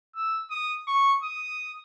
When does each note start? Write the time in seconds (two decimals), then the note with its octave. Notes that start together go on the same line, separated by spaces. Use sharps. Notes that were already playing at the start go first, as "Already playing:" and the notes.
0.15 E6
0.50 D#6
0.87 C#6
1.23 D#6